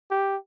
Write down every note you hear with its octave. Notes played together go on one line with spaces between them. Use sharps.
G4